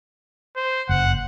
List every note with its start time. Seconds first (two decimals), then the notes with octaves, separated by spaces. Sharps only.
0.56 C5
0.89 F#1 F#5